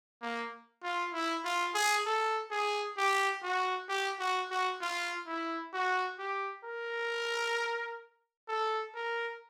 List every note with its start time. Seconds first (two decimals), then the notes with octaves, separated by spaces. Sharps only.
0.22 A#3
0.83 F4
1.13 E4
1.44 F4
1.74 G#4
2.06 A4
2.51 G#4
2.97 G4
3.43 F#4
3.89 G4
4.19 F#4
4.51 F#4
4.81 F4
5.27 E4
5.73 F#4
6.19 G4
6.64 A#4
8.48 A4
8.94 A#4